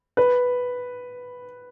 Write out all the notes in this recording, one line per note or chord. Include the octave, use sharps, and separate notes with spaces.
B4